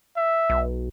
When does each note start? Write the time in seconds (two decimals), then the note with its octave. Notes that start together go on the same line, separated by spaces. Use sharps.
0.17 E5
0.50 B1